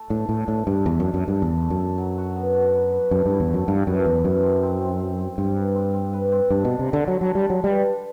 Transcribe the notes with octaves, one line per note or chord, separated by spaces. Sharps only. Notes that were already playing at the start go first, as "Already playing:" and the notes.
Already playing: A3 A4
A2 D4
A2 A3
A2 D4
G2 D4
E2 A3
F#2 D4
F#2
D4
G2
E2 A4
A3
F#2
A4
F#3
F#4
B3
F#4
B4
B4
F#2 A3
G2 E4
E2
F#2 A3
G2 A3
F#2 B4
E2 B4
F#2 B4
C4
C4
C4
C4
C4
G2 C4
B4
C4
C4
B4
C4
G2 D4
B2
D4
C3
D3 D4
F#3 A4
F#3 D4
G3
F#3 D4
G3 B4
B4